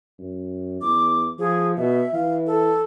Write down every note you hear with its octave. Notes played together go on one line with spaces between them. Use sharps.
F#2
E2 D6
F3 G#4
B2 E5
E3 F5
A4